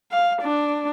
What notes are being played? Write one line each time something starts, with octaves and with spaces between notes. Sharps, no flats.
F5
D4